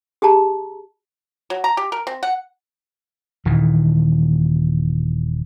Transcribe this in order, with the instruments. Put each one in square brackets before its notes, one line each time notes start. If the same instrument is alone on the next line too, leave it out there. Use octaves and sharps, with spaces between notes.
[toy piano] G4 G#4 A5 A#5
[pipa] F#3
A#5
G4
A#4
C4
F#5
[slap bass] D#1 D#3 E3